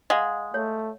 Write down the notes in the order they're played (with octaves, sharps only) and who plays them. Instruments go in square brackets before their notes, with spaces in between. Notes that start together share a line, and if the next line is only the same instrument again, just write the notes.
[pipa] G#3 [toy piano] D#5 F5 F#5
[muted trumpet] A3 [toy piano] C#5